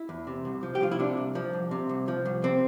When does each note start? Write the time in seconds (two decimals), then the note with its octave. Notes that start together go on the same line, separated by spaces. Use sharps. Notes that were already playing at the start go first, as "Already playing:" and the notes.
Already playing: E4
0.09 E2
0.27 C3
0.45 C2
0.63 F3
0.75 G4
0.81 C2 F4
0.91 E4
0.99 C3 D4
1.17 C2
1.35 F3
1.53 C2
1.71 C3
1.89 C2
2.08 F3
2.26 C2
2.44 C3 C4